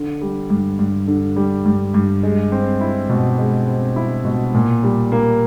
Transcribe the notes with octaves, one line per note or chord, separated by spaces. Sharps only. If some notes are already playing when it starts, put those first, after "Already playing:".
Already playing: D3
G3
G2
G2
D3
G3
G2
G2
G#3
C4
E4
B2
G#3
C4
E4
B2
A#2
G3
A#3